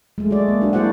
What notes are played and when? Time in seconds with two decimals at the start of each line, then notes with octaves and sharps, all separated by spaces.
0.18 G#3 A3
0.31 F#4 D5
0.48 A#3
0.61 D4 F#4
0.73 A#3 E4 F#4 C5 D5 F#5